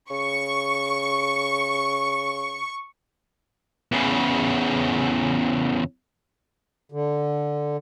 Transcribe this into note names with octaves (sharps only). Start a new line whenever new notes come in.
C#3 C#6
E2 C#3
D3